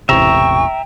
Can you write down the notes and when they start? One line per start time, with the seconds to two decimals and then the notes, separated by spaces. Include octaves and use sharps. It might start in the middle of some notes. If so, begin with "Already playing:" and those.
0.09 E1 A1 C3 E5 G5 A#5 C#6